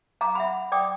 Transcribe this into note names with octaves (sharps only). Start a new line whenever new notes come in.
F5 A#5 D6
E5 F#5 B5
D5 G5 D6 D#6